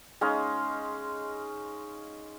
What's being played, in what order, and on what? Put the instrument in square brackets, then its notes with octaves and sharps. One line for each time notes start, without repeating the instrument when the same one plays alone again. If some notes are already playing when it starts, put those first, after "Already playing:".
[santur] G#3 C#4 D#4 F5